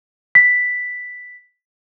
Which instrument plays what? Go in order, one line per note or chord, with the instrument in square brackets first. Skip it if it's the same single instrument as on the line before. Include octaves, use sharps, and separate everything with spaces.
[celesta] B6